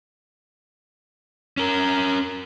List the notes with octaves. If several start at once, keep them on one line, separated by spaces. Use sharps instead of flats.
C#4 A#4